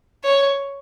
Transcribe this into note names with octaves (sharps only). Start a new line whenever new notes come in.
C#5